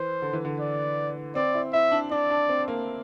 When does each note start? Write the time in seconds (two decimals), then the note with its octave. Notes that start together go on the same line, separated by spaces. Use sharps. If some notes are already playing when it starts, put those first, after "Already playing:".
Already playing: E3 C5
0.22 D3
0.33 E3
0.45 D3
0.60 D5
1.35 C4 D5
1.54 E4
1.73 E4 E5
1.92 D4
2.11 D4 D5
2.30 D4
2.49 C4
2.68 A#3